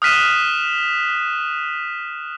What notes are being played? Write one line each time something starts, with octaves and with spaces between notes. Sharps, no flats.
D#6 F6 F#6 B6 D#7 E7